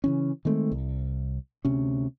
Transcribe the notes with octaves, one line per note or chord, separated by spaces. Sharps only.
C#3 E3 C#4
D#3 G#3 A3 C4
C2
D2 C3 C#4